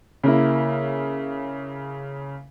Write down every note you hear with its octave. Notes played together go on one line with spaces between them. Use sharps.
C#3 A#3 E4